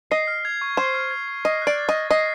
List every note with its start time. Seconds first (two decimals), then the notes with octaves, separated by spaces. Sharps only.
0.11 D#5 C7
0.27 F6
0.45 G#6
0.61 C#6
0.77 C5 C7
0.94 F6
1.11 G#6
1.28 C#6
1.45 D#5 C7
1.62 F#6
1.67 D5
1.78 A6
1.89 D#5
1.94 C#6
2.11 D#5 C7